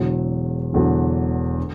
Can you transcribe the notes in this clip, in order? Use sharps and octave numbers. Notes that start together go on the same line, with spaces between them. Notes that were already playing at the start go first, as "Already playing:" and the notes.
Already playing: E1 E2 D3 F#3
E1 E2 D3 F#3
D3